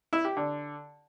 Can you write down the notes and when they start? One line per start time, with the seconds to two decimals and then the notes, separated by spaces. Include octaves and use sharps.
0.13 E4
0.25 G4
0.37 D3